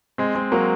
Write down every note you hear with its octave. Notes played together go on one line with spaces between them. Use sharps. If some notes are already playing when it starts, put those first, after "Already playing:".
G#3 C4
G#3 C4
F#3 A#3